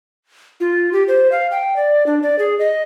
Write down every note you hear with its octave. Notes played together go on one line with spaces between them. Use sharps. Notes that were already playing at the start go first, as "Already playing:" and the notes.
F4
G4
C5
F5
G5
D5
D4
D5
G#4
D#5